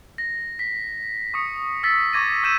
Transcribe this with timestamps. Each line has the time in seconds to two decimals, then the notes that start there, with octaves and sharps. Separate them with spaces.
0.18 A#6
0.59 B6
1.34 C#6 D#6 C#7
1.83 E6 A6 B6
2.13 C#6 D6 G#6 A#6 D#7
2.44 E6 G6 D#7 E7